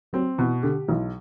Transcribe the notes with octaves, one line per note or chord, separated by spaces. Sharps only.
F#3 C4
B2 E3
D3 G4
B1 E3